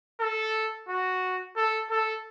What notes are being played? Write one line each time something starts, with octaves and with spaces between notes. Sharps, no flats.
A4
F#4
A4
A4